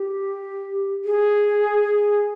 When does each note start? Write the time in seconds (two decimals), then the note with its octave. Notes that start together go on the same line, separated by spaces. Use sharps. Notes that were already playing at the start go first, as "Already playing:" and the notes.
Already playing: G4
1.05 G#4